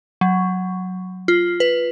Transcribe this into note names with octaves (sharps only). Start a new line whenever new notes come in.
F#3
F4
B4